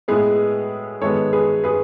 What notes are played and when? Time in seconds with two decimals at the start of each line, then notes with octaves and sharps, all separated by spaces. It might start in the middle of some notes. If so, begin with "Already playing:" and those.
0.08 A2 G#3 B3 G#4 B4
1.01 G#2 D#3 G#3 B3 A4 C#5
1.33 G#4 B4
1.64 G#4 B4